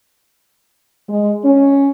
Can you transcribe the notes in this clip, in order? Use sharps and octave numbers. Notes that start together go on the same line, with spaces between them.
G#3
C#4